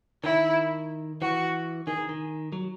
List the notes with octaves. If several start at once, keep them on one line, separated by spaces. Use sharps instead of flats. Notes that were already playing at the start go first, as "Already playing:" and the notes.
D#3 E4
E3 F#4
D#3 G#4
D#3
D#3
F#3